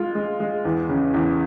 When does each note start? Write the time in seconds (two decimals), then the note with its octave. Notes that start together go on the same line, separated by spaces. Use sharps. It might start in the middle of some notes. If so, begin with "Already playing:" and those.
Already playing: G#3 F4
0.15 G#3
0.40 G#3
0.65 E2
0.89 C#3
1.14 E2